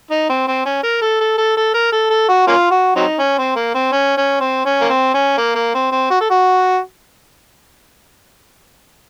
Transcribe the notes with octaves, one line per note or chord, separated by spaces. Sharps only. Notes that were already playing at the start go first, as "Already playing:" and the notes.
D#4
C4
C4
C#4
A#4
A4
A4
A4
A4
A#4
A4
A4
F#4
A#3 C#4 F4
F#4
F#3 C4 D#4
C#4
C4
A#3
C4
C#4
C#4
C4
C#4
A#3
C4
C#4
A#3
A#3
C4
C4
F#4
A4
F#4